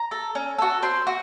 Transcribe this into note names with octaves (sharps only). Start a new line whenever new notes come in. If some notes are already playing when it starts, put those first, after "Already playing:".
Already playing: A#5
A4
C#4
F#4 A4
C4 C6
F#4